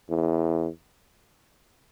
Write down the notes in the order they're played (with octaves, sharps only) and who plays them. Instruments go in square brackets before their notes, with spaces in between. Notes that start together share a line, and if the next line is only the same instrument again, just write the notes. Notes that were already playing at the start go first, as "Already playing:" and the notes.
[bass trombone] E2